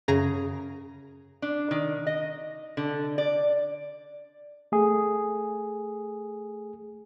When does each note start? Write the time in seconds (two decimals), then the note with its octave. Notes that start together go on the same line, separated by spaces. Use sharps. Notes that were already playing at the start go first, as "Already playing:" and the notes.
0.08 F#2 C#3 G#4 A#5 A#6
1.42 D4
1.71 D#3
2.07 D#5
2.77 D3
3.18 D5
4.72 A3 G#4